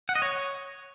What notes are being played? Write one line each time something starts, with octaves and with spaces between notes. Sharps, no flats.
F#5
D#5
C#5